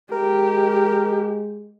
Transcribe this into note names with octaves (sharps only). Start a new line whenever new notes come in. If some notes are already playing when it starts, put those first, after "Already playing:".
G#3 G4 A#4